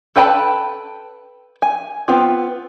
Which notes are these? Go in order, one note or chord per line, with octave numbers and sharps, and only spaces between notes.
A4 B4 G5 A5 B5
G#5
B3 C4 F4